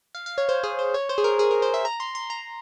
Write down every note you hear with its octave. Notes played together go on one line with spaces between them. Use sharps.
F5
F5
C#5
C5
G#4
C5
C#5
C5
G#4
A#4
G#4
A#4
C5
E5
A#5
C6
C6
A#5